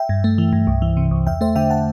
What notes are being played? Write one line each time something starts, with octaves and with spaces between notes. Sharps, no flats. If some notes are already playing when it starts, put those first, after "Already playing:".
Already playing: E5 G5
G2
A3
E3
G2
C2
E3
C3
C2
E2 E5 G5
A3 C5 E5
D3 E5 G5
F#5 A5